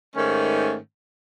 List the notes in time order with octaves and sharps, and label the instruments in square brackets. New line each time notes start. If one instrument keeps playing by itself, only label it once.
[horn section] G#2 D#3 A3 C#4